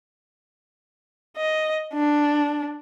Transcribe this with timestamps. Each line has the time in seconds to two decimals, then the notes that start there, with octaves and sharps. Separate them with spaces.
1.37 D#5
1.94 D4